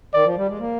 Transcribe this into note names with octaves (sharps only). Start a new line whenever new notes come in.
D#3 D5
F3
G3
G#3
A#3